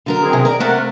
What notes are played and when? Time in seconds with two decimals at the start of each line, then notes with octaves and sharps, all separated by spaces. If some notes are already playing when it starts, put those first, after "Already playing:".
0.06 D3 F#3 A#4
0.22 D#3 C4 G#4
0.33 C3
0.45 A#4 D5
0.60 C3 A3 A#3 A#4 F#5